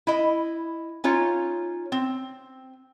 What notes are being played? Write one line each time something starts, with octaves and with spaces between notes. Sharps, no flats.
E4 D#5
C#4 D#4 F4 C#5
C4